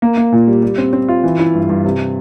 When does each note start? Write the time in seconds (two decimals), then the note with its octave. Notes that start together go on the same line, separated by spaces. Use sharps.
0.02 A#3
0.17 A#3
0.32 A#2
0.47 G3
0.63 G3
0.78 C4
0.93 C4
1.09 F4
1.24 E3
1.39 E4
1.54 G2
1.69 G2
1.84 C3